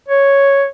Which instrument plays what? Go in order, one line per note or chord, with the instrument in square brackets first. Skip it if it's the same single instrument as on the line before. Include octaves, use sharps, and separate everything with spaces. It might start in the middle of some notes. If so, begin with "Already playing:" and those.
[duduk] C#5